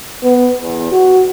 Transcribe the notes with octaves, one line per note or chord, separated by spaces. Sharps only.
B3
E2
F#4